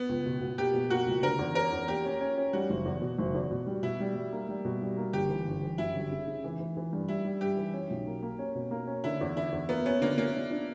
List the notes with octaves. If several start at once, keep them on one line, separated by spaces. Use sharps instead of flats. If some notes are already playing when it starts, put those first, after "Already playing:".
Already playing: B3
C#2
B2
B2
A#3 G4
B2
A#3 F#4
C#2
D3 A#4
E2
C#4 A#4
E2
A#3 G4
C#4
C#4
C#4
G3 F#4
F#1
E2
B2
F#1
E2
B2
G3
B2 E4
G3
G3
A#3
G3
B2
G3
A#3
G1 G4
E3
G1
E3
F#2 E4
G1
C#3
C#3
E3
E3
E3
G2
G3 E4
G3
G2 G4
E3
C#4
B1
A#3
A#3
C#4
B2
A#3
C#4
D3 E4
E2
D3 E4
E2
A#3 B3
B3 C#4
D3 A#3
A#3 C#4
D4
D4